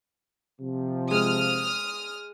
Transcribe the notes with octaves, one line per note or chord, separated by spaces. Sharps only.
C3 F3
G#3 D#6 F6